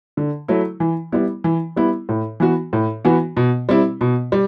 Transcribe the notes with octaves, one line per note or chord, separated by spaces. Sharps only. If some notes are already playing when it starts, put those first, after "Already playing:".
D3
F#3 A3 E4
E3
G3 B3 E4
E3
G3 B3 E4
A2
E3 B3 F#4
A2
E3 B3 F#4
B2
G3 C4 E4
B2
G3